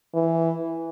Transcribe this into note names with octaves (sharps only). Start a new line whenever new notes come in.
E3